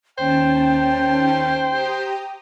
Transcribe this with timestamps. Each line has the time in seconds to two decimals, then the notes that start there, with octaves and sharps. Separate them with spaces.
0.18 D#2 C#4 C5 G5 A5
1.71 G4 A#5 D#6